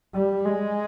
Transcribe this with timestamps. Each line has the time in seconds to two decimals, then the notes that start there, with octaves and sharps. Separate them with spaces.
0.15 G3
0.45 G#3